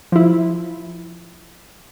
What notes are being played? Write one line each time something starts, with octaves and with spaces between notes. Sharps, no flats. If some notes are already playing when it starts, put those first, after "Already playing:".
F3 E4